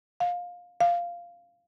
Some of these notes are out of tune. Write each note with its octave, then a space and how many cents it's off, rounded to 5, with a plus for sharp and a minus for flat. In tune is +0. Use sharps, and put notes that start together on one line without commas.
F5 +20
F5 -5